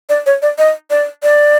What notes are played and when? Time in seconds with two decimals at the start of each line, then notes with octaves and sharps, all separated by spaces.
0.09 D5
0.26 C#5
0.42 D5
0.58 D#5
0.90 D5
1.23 D5